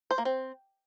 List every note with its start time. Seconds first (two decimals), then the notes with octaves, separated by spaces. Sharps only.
0.11 C5
0.18 A#3
0.25 C4